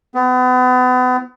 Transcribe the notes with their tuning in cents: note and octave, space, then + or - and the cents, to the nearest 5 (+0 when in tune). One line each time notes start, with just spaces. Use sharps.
B3 +35